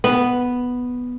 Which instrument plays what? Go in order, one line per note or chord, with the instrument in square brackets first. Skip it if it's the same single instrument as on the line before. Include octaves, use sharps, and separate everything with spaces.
[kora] B3